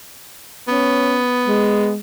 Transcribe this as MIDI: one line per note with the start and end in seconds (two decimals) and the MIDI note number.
0.68 1.92 59
0.68 1.21 61
1.46 1.98 56